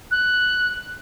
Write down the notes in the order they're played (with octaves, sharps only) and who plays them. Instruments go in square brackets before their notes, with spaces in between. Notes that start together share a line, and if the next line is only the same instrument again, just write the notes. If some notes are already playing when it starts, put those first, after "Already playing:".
[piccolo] F#6